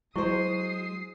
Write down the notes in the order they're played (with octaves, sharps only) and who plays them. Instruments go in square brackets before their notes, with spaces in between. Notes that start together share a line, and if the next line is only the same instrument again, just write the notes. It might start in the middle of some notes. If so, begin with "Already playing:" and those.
[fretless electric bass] F#3 [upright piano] G#3 C5 [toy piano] E4 C#6 [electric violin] D#6 C7